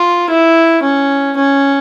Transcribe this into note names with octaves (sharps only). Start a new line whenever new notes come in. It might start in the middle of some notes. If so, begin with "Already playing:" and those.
Already playing: F4
E4
C#4
C#4